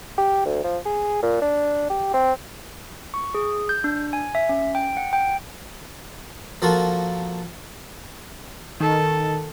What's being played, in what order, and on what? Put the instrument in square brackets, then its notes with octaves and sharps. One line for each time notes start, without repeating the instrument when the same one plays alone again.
[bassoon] G4
D2
F3
G#4
A#2
D4
G4
C4
[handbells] C#6
G#4
G6
D4
G#5
E5
C#4
G5
F#5
G5
[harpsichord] F3 A#3 F4 F#4 A4 A#4
[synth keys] D#3 [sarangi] A4